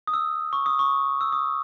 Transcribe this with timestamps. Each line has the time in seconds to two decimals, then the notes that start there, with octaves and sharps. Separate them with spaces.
0.07 D#6
0.14 E6
0.53 C#6
0.66 D#6
0.79 C#6
1.21 E6
1.32 D#6